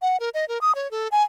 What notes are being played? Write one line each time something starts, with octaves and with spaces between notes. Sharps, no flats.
F#5
A#4
D#5
A#4
D#6
C#5
A4
G#5